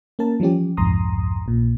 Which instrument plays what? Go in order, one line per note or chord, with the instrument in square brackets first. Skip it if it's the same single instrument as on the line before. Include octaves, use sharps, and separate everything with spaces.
[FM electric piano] A#3 C#4 A#4 A5
E3 F3 G3 C#4 G4
C2 F2 G#2 A#5 C6 D#6
A#1 A#2